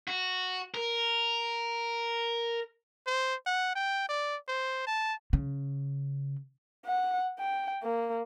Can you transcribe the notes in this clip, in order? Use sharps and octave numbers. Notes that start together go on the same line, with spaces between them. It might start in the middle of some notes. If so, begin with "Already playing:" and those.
F#4
A#4
C5
F#5
G5
D5
C5
A5
C#3
F#5
G5
A#3